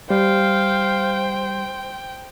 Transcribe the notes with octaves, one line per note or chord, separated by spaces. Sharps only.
G3 C5 F5 G5